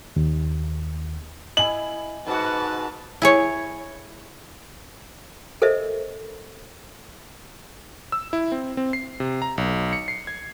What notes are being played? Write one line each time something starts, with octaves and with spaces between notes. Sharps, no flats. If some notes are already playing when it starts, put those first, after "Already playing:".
D#2
E4 D#5 G#5 F#7
G#2 D#4 F#4 B4 A5
E4 G#4 C#5
A4 A#4 C5 D#5 E5
E6
E4
C4
C4
C7
C3
A#5
B1
C#7
C7
G#6